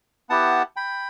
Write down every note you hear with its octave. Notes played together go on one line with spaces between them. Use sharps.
B3 E4 G4 F#5 A5
G5 B5